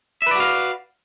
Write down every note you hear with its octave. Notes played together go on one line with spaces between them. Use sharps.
F#4 B4 D5 E5 F5